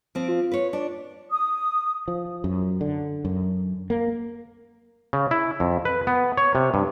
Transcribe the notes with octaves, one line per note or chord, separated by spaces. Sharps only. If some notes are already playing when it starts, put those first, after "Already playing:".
F3 C4 D7
F4
B4 C#5
D4 D5
D#6
F3
F#2
D3
F#2
A#3
C#3
E4
F2
B4
B3
C#5
C3
G2